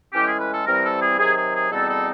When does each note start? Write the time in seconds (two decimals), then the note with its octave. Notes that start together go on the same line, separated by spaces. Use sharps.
0.13 A2 E3 G#3 C#4 G4
0.27 G#4
0.39 B4
0.53 A4
0.65 C3 E3 G3 C4 A#4
0.83 A4
1.00 G#4
1.18 C3 D#3 F#3 G#4
1.36 G#4
1.54 G#4
1.71 E2 B2 G3 C4 D#4 A4
1.89 A4